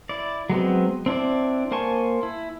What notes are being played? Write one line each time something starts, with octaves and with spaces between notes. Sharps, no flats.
E4 D5
F#3 G#3 B3 C4
C4 D4 E4 D5
A#3 C5 G#5 A5 C#6
E4